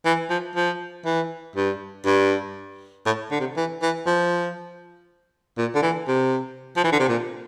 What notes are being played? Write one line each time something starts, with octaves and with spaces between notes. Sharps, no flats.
E3
F3
F3
E3
G2
G2
A2
D3
C3
E3
E3
F3
A#2
D3
E3
C3
F3
E3
D3
C3
A#2